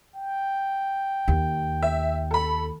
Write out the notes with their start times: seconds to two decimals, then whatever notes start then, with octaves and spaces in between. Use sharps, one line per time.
0.16 G5
1.28 D#2
1.83 E5
2.31 A4 B5